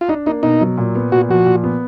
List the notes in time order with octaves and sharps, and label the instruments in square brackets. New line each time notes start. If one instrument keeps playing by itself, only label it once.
[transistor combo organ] F4
[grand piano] D4 [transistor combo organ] D#4
[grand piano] A#3 [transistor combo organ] D#4
[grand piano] B2 [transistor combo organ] D#4
[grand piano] F#3
A#2
B3
[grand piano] A#2 [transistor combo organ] F#4
[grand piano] F3 [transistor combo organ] F#4
[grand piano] A#2
B3